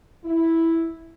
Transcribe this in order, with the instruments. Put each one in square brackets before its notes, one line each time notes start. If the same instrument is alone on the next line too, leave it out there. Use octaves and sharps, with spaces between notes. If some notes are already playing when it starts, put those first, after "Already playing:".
[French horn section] E4